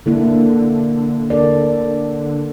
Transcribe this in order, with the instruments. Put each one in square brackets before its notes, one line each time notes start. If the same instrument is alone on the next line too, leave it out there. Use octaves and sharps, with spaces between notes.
[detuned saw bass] D3 [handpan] A#3 E4 A4
[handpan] A4 A#4 D5